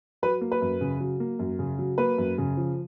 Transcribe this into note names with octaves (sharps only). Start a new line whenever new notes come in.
F#3 B4
A#3
B4
F#2
C#3
F#3
A#3
F#2
C#3
F#3
A#3 B4
F#2
C#3
F3